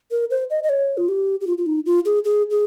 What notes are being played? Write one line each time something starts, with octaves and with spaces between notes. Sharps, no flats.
A#4
C5
D#5
D#5
C#5
F4
G4
G4
F4
F4
D#4
F4
G#4
G#4
G#4